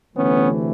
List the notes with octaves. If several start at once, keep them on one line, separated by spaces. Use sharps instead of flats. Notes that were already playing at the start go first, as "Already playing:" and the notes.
D2 C3 E3 A3 B3 C#4